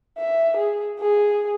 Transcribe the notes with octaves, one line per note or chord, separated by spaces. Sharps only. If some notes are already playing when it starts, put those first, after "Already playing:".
E5
G#4
G#4